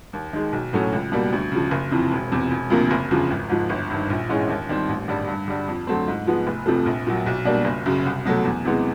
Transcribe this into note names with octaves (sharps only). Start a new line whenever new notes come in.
D#2
D#3 G#3
B1
A2 F#3 A3 C#4
C#2
B2 G3 A#3
D2
C#3 F3
F#1
F2 C3 E3
E1
E2 C3
E1
D2 C3 F3 A#3
F#1
E2 C#3 F3
G#1
G#2 F3
G1
G2 D#3
A#1
G#2 E3 G#3 C#4
D#2
D#3 G3 C4
A1
G2 D3 G3
G2
D3 G3
F2
D3 F#3 A3 C4
G#2
F3 G#3 B3
F1
F2 C3 F3 A3
A#1
A#2 F#3
B1
B2 G3 A#3 D4
F#1
F#2 C#3
C2
B2 F#3 A3
E2
C3 E3 G#3 B3